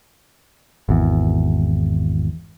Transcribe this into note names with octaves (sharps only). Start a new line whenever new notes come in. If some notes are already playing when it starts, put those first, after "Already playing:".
G#1 E2